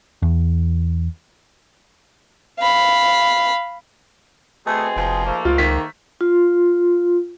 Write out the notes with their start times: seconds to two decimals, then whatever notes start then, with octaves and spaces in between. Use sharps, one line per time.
0.22 E2
2.60 F5 B5
4.66 B2 A3 C4 G#4
4.96 F1 F3
5.25 G#2 A3 A#3
5.45 C#2 F4
5.58 D#3 B6
6.21 F4